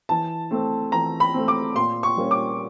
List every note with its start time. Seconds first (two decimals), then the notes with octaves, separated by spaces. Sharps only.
0.09 E3 A5
0.51 A3 C4
0.92 E3 A#5
1.20 B5
1.34 A3 C4
1.48 D6
1.75 A#2 C6
2.03 C#6
2.17 G3 A#3 C#4
2.31 D6